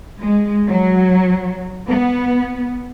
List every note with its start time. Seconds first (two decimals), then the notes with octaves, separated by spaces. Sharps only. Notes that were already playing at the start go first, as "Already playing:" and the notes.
0.21 G#3
0.68 F#3
1.87 B3